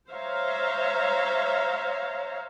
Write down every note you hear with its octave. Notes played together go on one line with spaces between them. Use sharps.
C5 C#5 E5 F5 A#5